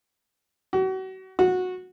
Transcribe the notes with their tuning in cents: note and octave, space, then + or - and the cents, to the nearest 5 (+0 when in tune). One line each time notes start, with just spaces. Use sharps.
F#4 +35
F#4 -15